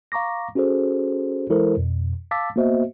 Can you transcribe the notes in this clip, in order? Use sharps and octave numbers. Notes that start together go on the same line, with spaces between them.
F5 A#5 C#6 D6 A#6
C#4 F#4 G#4 A4 C5
E3 G#3 E4 A4 A#4 C5
F2 B2
F5 A5 D6 E6 A6 B6
A#3 B3 F#4 C5 D#5 E5